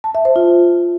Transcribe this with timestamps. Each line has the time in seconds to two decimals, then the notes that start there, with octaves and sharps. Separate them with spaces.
0.04 A5
0.15 E5
0.25 C5
0.36 F4